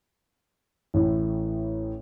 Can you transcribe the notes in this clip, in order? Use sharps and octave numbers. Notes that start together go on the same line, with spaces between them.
A1 A2